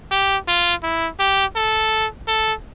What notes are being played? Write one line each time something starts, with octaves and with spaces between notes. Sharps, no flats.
G4
F4
E4
G4
A4
A4